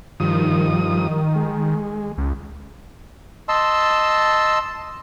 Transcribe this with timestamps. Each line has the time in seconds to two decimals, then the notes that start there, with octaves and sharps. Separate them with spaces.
0.20 G2 D#3 F3 D#6
1.35 G#3
2.18 C#2
3.49 D#5 A5 C6 E6